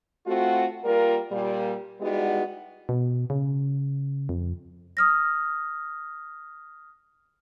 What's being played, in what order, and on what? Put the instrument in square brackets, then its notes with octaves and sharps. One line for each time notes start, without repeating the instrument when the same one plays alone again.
[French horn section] A3 C4 F4 F#4
G3 A#3 F4 A#4
A#2 G3
G3 G#3 B3 D#4 E4 F#4
[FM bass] B2
C#3
F2
[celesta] D#6 F6 A#6